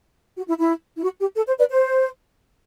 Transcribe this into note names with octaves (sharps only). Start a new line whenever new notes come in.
F#4
E4
E4
E4
F#4
G4
A4
C5
B4 D5
C5